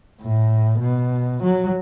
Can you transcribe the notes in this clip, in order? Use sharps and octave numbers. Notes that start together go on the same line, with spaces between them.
A2
B2
F#3